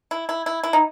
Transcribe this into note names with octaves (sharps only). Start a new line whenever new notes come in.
E4
E4
E4
E4
D#4